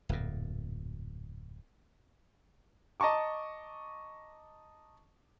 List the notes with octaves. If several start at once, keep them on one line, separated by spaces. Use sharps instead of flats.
D1 F2 A#2
D#5 A5 A#5 C#6 D6